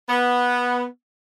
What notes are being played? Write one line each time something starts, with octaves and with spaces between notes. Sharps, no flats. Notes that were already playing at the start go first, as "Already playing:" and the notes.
B3